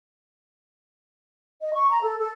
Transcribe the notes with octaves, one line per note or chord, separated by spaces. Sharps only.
D#5
C#6
A#5
A4
A4